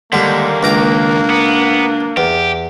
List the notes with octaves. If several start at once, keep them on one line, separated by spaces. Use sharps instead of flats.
D#2 D3 G3 G#3 A#3
C#2 D4 A#5 D6
B3
E2 G4